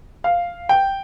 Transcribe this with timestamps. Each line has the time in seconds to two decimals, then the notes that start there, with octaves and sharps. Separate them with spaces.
0.24 F5
0.69 G5